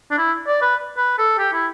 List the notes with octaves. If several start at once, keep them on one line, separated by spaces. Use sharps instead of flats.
D4
E4
D5
B4
B4
A4
G4
E4